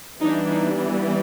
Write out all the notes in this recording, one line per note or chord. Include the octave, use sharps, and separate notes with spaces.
E3 G3 B3 D4 D#4
D#4
D4